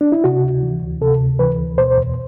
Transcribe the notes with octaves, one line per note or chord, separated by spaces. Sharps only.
D4
E4
C3 F#4
D2
E3
D2
C3 A4
D2
E3 B4
D2
B2 C5
E2